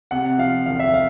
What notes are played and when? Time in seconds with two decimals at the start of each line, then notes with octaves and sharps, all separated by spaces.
0.11 C3 F#5
0.38 F3 F5
0.66 E1 F5
0.80 E5
0.94 F5